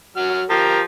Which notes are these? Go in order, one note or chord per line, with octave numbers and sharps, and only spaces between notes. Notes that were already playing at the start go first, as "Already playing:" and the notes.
F#3 F#4 F6
F3 G4 A#4 A#5